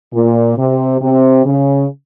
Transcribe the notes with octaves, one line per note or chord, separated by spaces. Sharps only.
A#2
C3
C3
C#3